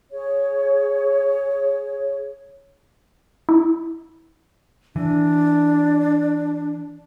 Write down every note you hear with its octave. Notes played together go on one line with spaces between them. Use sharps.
G#4 C#5
E4
E3 D4